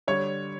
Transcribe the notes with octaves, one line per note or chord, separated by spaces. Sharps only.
D3 G3 C#5